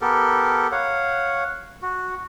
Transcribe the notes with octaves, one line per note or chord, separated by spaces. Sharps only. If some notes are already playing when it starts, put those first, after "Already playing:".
B3 G4 A4 A#4
C#5 F5 F#5
F#4